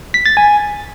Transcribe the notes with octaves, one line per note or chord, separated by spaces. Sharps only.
B6
A6
G#5